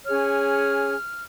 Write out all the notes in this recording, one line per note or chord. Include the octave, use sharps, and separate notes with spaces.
C#4 G#4 C#5 F6